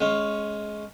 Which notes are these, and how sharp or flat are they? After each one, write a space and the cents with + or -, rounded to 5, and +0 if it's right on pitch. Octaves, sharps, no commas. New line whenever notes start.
G#3 +20 C#4 +0 F5 +10